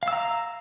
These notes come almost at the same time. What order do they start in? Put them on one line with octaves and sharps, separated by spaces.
F5 E6 A#5